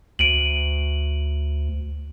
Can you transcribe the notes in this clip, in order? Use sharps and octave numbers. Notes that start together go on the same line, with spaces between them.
D2 D7 D#7 F#7